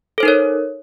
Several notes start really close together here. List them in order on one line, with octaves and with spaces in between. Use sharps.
A4 C5 D#4 A#4 C#5